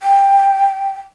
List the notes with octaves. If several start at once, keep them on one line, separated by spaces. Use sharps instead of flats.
G5